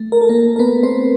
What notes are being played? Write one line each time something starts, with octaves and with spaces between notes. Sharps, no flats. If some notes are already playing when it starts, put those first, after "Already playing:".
Already playing: A3
A#4
A4
A#3 A#4
A#4
B3 B4
C4 C5